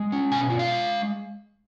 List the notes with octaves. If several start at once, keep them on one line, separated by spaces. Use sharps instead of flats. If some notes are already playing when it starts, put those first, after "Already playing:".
Already playing: G#3
C#4
B2 G#5
F4
F5
G#3